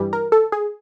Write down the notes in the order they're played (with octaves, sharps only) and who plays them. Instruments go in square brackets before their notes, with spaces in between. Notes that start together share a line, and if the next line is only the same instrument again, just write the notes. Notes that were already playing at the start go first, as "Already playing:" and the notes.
Already playing: [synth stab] G2 E3 G3
A#4
A4
G#4